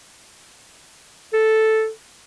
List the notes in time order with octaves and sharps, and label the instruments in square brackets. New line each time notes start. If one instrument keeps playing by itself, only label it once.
[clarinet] A4